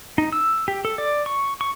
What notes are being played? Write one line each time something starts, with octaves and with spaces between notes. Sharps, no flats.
D#4
E6
G4
A4
D5
C#6
C#6